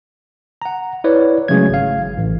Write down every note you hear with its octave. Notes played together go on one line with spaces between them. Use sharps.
F#5 A#5
E4 B4 C#5 D5
C#3 F#3 G#3 A3 G#6
G#1 F5
A1